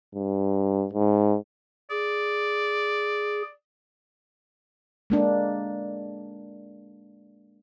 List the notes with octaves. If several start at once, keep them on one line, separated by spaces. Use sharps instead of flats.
G2
G#2
G#4 D5
G#3 A#3 D4